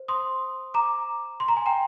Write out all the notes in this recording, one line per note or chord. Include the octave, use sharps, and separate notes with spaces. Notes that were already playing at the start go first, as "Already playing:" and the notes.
Already playing: C5
C6 D#6
A#5 D6
C6
A#5
G#5
G5 A#5